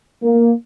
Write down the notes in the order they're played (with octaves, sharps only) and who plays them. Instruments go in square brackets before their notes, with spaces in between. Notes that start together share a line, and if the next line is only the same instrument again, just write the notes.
[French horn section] A#3